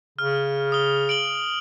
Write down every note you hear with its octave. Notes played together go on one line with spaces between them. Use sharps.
C#3 F6
D#6 G7
D7 F#7 G7